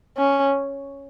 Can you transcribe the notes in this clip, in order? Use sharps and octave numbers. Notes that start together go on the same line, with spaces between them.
C#4